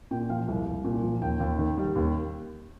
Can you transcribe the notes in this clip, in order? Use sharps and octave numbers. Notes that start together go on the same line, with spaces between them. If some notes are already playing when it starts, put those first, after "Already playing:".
A#2 G5
F3 F5
C2
C2
A#2
F3
D#2 G5
D#2
D#3
G3
D#2